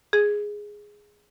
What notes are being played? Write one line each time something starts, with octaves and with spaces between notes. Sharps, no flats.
G#4